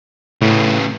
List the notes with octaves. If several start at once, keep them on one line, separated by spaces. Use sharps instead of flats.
A2 C#3 B3